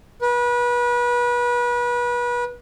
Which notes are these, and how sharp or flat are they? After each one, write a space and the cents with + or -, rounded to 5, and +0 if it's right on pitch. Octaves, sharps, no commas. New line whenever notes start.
B4 -30